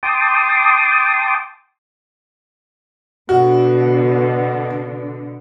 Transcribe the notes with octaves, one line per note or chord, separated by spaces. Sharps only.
G5 A5 C6 D6 D#6
B2 D3 F#4